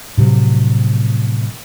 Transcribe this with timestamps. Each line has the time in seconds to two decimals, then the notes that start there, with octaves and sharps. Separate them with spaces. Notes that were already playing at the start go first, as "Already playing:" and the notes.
0.17 A2 C3 F3 F#3